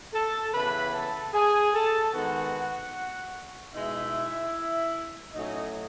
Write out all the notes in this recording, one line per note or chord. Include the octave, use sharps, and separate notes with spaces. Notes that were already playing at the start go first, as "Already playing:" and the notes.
A4 A5
C#3 E3 B3 B4 B5
A4 A5
G#4 G#5
A4 A5
D#3 G#3 B3 D#4 F#4 F#5
B2 G#3 D#4 E4 E5
A2 F#3 A3 C#4 D#4 D#5